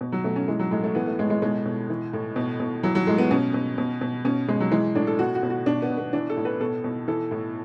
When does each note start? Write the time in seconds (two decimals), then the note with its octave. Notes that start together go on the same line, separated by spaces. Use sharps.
0.01 B2
0.12 F#3
0.24 B2 A3
0.36 C#4
0.48 E3 G#3
0.59 F#3
0.71 A2 G#3
0.83 A3
0.95 E3 B3
1.07 A3
1.19 A2 G#3
1.30 G#3
1.42 B2 G#3
1.66 B2
1.90 E3
2.13 A2
2.36 B2
2.60 B2
2.83 E3 F#3
2.95 F#3
3.07 A2 G#3
3.18 B3
3.31 B2 C#4
3.54 B2
3.78 B2
4.01 B2
4.25 B2 C#4
4.48 B2 G#3
4.60 F#3
4.72 E3 G#3
4.95 A2 D4
5.07 A4
5.19 B2 F#4
5.35 F#4
5.43 B2
5.50 F#4
5.66 B2 D4
5.82 B3
5.90 B2
5.98 B3
6.13 E3 D4
6.30 A4
6.37 A2
6.45 B4
6.60 B2 A4
6.84 B2
7.08 E3 A4
7.31 A2